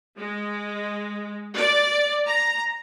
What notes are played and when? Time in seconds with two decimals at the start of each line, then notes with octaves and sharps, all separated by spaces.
0.18 G#3
1.57 D5
2.26 A#5